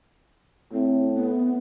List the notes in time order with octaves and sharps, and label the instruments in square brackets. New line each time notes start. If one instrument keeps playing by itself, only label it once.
[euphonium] A2 [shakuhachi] C4
[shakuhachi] B3